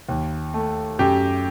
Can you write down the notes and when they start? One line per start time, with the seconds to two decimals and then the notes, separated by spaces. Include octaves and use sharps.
0.09 D#2
0.54 A3
0.99 F#2 G4